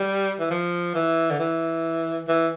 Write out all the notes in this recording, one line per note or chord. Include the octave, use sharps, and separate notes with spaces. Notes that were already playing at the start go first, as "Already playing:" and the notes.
Already playing: G3
E3
F3
E3
D3
E3
E3